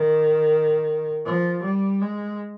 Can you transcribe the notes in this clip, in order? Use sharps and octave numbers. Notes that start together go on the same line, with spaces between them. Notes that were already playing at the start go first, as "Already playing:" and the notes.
Already playing: D#3
F3
G3
G#3